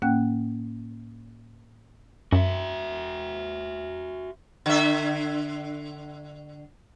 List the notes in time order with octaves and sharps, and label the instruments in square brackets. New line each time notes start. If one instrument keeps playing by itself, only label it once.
[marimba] A2 A#3 C#4 F#5 G5 F#6
[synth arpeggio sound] F#2 [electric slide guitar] F#4 E5
[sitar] D3 E5